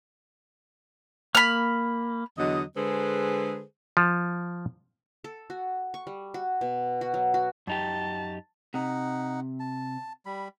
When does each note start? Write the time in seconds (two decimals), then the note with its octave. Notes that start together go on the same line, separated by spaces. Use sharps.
1.35 A#3 B5 F6
2.38 E2 D3 F#3 D#5
2.76 D3 G#3 G#4 A4 B4 C5
3.97 F3
5.24 A4
5.50 F#4
5.94 C#6
6.07 G3
6.34 F#4
6.61 B2
7.01 F#4
7.14 F#3
7.34 F#4
7.67 F#2 D#4 G4 A5
8.74 C3 D#4 F#5
9.60 A5
10.26 G3 B5